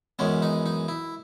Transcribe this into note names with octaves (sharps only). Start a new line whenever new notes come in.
F#2 E3 G#3 B3 C#4
D#4
D#4
E4